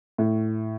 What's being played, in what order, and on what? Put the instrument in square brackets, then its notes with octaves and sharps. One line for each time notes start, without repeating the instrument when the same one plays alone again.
[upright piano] A2